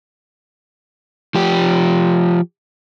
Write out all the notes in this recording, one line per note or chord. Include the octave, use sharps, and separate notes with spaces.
F3 G4